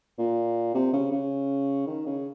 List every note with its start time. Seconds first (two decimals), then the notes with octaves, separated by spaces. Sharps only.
0.18 A#2
0.74 C3
0.93 C#3
1.12 C#3
1.87 D#3
2.06 C#3